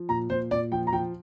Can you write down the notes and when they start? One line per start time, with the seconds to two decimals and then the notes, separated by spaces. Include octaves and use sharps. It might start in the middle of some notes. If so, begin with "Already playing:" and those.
Already playing: F3
0.09 A#2 A#5
0.30 A#2 C5
0.51 A#2 D5
0.72 F3 G5
0.87 A#5
0.92 F3 G5